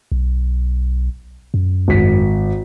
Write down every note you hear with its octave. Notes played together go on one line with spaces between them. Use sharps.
B1
F#2
G#1 B6